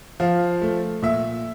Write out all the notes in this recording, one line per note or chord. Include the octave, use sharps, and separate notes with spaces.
F3 F5
A3
A#2 E5